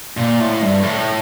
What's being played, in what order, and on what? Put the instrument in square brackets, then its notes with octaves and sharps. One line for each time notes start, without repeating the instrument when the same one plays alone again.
[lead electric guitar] A#2
A2
G2
A2